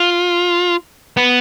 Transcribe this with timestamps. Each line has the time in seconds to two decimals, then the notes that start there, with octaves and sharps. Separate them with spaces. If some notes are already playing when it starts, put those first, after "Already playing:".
Already playing: F4
1.17 B3